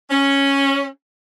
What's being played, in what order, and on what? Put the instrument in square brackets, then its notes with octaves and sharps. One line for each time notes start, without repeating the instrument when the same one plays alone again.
[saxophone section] C#4